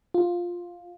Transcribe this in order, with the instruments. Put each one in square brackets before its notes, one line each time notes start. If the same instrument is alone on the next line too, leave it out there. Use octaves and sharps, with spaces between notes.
[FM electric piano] F4